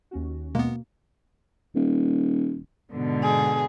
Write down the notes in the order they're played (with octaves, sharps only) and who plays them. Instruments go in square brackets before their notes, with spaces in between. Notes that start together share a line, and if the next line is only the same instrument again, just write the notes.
[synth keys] D#2 C#4 F#4
[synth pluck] B2 A#3 [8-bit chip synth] G#3 B3
[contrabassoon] D#1
[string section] G#2 B2 D3
[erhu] G#4